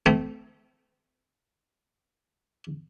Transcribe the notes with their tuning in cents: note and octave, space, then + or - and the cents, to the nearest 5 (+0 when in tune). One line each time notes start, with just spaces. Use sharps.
A3 -10 C4 -35